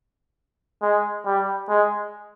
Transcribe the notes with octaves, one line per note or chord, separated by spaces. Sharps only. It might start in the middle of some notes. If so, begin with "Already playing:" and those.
G#3
G3
G#3